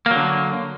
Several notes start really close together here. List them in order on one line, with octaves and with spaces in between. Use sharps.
A#3 F#3 D3